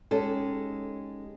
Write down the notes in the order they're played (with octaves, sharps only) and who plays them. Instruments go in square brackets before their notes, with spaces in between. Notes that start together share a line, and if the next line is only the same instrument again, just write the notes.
[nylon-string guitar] G#3 C#4 D#4 G4 A4